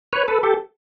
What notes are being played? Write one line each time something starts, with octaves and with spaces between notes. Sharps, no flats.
B4 C#5
A4 B4
G4 A4